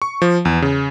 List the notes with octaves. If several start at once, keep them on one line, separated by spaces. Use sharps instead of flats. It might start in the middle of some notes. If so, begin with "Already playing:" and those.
C#6
F3
E2
C#3